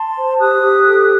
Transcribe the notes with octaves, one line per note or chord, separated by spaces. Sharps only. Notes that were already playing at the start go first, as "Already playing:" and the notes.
Already playing: A5 C6
C5
G4 D#6 F#6
G4
A4